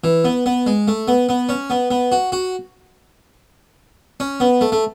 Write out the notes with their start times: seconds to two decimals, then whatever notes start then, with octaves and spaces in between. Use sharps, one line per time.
0.04 E3
0.25 B3
0.46 B3
0.67 G#3
0.88 A3
1.08 B3
1.29 B3
1.49 C#4
1.70 B3
1.91 B3
2.12 F#4
2.32 F#4
4.20 C#4
4.40 B3
4.61 A3
4.72 A3